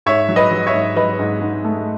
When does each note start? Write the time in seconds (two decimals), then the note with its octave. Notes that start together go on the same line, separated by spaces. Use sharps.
0.06 G#2 C#5 E5
0.29 F#3
0.36 B4 D#5
0.51 F#3
0.67 C#5 E5
0.74 G#2
0.96 F#3 B4 D#5
1.19 G#2
1.42 G#2
1.64 A3